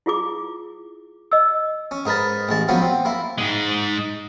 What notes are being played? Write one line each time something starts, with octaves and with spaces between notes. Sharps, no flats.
E4 F4 G#4 D6
D#5 E6
C#4
G#2 D#4 A#4 B4 A5
A1 G#3 A5
F3 F#3 A#3 B3 C#4
C4
A#3 E4
G#2 G#3